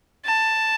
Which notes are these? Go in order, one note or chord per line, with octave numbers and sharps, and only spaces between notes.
A5